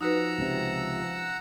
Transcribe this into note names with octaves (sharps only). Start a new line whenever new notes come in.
F3 D#4 F#4 B4 F#5 A#5 E6
C#2 C3